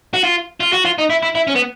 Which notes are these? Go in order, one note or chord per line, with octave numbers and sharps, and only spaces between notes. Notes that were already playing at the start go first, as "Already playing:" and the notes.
F#4
F4
F4
F#4
F4
D#4
E4
E4
E4
C#4
B3